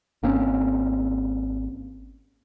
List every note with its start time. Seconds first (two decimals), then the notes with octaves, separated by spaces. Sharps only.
0.23 G#1 A#3 C4 C#4